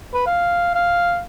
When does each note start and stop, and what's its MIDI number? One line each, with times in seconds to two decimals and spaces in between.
0.14 0.22 71
0.27 0.74 77
0.75 1.21 77